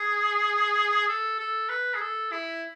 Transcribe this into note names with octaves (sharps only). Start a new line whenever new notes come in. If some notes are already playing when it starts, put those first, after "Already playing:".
Already playing: G#4
A4
A4
B4
G#4
A4
E4